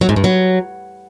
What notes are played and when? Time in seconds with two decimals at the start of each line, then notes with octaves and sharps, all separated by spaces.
0.01 F#3
0.09 G#2
0.16 G2
0.24 F#3